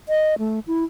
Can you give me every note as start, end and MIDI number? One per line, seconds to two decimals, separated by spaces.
0.09 0.35 75
0.39 0.60 57
0.67 0.84 64